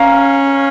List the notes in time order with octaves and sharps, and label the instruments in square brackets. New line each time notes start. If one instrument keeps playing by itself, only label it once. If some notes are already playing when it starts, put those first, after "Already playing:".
Already playing: [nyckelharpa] C#4 [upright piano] F5 A#5